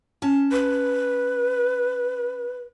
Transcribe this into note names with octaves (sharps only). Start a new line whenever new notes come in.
C#4 A5
B4